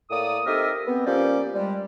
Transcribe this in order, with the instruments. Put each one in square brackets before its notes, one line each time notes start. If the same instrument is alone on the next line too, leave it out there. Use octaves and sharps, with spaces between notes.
[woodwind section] A2 A#3 D5 D#6
C4 D#4 G4 A4 A#4 E5
B3 C4
F3 A#3 C#4 G4 C5 D5
G3 G#3